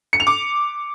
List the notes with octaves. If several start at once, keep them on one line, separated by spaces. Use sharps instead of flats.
C#7
F7
D6